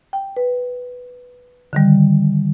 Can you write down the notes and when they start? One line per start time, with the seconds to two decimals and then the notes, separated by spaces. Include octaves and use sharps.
0.13 G5
0.37 B4
1.73 D3 D#3 G3